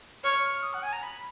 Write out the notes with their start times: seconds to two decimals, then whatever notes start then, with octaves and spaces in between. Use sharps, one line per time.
0.24 C#5 F6
0.44 F6
0.63 D#6
0.73 F#5
0.83 G#5
0.93 A#5
1.02 B5